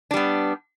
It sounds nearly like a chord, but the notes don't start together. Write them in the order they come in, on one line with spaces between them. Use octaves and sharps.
D4 G3 B3